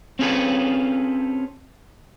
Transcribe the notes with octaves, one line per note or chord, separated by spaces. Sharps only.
C4 C#4 F4 G#4 A4 B4